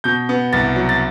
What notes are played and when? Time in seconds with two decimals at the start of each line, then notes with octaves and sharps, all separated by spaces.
0.04 B2 G6
0.29 B3
0.53 C2 A6
0.76 F#3
0.89 A6